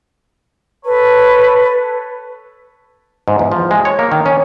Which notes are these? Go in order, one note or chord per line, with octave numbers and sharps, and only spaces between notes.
A4 B4 C#5
G#2
E2
F3
G#3
C#5
A#3
D#3
C#4